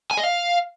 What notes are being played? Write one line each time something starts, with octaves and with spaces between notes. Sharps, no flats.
G#5
D#5
F5